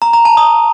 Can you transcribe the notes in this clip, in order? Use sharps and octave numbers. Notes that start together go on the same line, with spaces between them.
A#5
A#5
A5
D#6